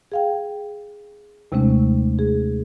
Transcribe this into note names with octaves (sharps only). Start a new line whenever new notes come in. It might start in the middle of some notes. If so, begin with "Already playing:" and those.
G#4 F5 G5
D#2 C3 G#3 A3 C#4
G#4